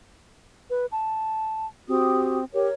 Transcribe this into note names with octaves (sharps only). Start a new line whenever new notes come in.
B4
A5
C4 F#4 G4 D#6
G4 A#4 C#5